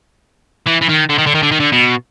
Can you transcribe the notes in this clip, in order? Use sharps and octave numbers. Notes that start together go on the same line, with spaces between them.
E3
E3
D#3
D3
D#3
D3
D#3
D3
D#3
D3
B2